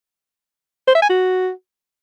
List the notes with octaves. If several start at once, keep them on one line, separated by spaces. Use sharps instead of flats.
C5
E5
G#5
F#4